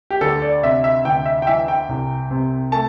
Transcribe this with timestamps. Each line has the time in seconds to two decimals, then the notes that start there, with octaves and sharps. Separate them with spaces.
0.10 G4
0.21 D2 A4
0.42 D5
0.63 C3 E5
0.84 E5
1.05 D2 G5
1.26 E5
1.42 G5
1.47 E3 E5
1.68 G5
1.89 C2
2.31 C3
2.72 A3 A5